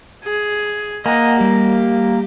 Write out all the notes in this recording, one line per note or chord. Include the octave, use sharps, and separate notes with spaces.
G#4
A#3 D#5 F#5 G#5
G3 G4